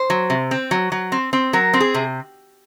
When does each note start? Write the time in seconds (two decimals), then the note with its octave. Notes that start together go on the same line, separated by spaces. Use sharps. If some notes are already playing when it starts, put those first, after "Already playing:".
Already playing: C5
0.10 F#3
0.30 C3
0.51 C4
0.71 F#3
0.92 F#3
1.12 C4
1.33 C4
1.53 F#3 A#4
1.74 C4
1.80 G#4
1.94 C3